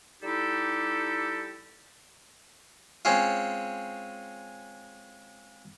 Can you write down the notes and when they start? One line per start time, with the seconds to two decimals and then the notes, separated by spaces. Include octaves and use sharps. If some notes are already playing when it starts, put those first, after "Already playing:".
0.23 G3 D#4 E4 G4 A4
3.05 G#3 C4 C#4 F4